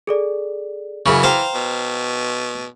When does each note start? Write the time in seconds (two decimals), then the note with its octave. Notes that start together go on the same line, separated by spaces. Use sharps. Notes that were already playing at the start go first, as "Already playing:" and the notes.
0.07 G#4 A4 D5
1.06 F#2 C#3 E3 G#4 B5 C#6
1.23 C5 F5 G5 A#5 F7
1.54 B2